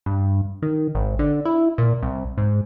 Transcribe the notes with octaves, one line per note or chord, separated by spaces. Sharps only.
G2
D#3
G#1
D3
E4
A#2
C2
G#2